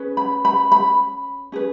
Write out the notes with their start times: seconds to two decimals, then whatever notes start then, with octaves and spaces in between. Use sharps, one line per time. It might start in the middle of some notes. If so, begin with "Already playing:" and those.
Already playing: C#4 G#4 B4
0.17 B5
0.45 B5
0.72 B5
1.52 C#4 G#4 B4